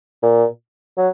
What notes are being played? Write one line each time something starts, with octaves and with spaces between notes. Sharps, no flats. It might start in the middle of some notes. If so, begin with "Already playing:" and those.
A#2
F#3